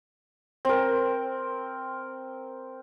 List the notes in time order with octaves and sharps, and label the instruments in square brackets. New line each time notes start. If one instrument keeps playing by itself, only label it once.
[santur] C4 A#4